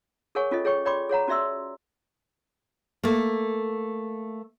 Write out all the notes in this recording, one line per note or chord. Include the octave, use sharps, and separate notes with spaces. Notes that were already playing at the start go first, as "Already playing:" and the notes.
G#4 A#4 C#5 F#5 G#5 C#6
C#4 F4 A4 D#5
G#4 C#5 G5 C#6
C#5 D5 G5 B5 C6 D6
G#4 C#5 F#5 A#5
C#4 F#4 D5 E5 C6 E6
A3 A#3